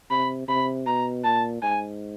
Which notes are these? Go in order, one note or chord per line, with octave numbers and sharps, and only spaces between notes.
C3 B5
C3 B5
B2 A#5
A#2 A5
G#2 G#5